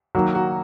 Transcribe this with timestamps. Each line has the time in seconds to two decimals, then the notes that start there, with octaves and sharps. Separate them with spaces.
0.15 D#3 F#3 A#3 F#4
0.35 F#4